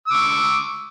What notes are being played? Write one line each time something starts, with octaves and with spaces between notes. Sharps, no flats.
C#6 D6 E6